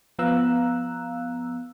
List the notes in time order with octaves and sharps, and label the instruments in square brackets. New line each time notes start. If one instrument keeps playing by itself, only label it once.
[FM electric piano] F3 B3 F5 A#5 E6 F#6